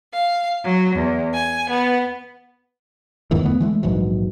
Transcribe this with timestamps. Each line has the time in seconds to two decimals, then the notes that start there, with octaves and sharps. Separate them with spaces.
0.13 F5
0.64 F#3
0.96 E2
1.33 G#5
1.70 B3
3.31 E2 G#2 D#3 E3
3.43 D3 A3 B3
3.60 E3 G#3 A3
3.83 A#1 G#2 E3 F#3